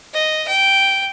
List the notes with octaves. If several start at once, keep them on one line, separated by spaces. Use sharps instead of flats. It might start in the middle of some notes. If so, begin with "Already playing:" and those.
D#5
G5